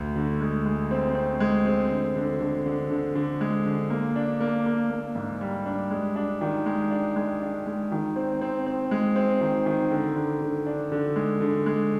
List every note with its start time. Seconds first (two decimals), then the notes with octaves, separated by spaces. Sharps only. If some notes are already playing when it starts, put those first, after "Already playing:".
Already playing: D2
0.16 D3
0.41 G#3
0.66 G#3
0.91 C4
1.15 C4
1.40 G#3
1.66 C4
1.90 D3
2.16 D3
2.41 D3
2.66 D3
2.91 D3
3.15 D3
3.41 G#3
3.66 D3
3.90 A#3
4.16 D4
4.40 A#3
4.66 A#3
4.91 A#3
5.15 G#2
5.41 G3
5.66 D4
5.91 G#3
6.16 D4
6.41 D#3
6.66 G#3
6.91 D4
7.16 G#3
7.42 D4
7.66 G#3
7.91 D#3
8.16 C4
8.41 C4
8.66 C4
8.91 G#3
9.16 C4
9.41 D#3
9.66 D#3
9.91 D3
10.16 D3
10.41 D3
10.66 D4
10.92 D3
11.16 G#3
11.41 D3
11.66 G#3